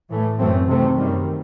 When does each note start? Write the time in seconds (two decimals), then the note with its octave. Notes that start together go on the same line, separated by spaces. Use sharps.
0.10 A2 E3 A3
0.39 F#2 E3 A3 C4
0.67 C3 D#3 A3 C4
0.96 F#2 D#3 G3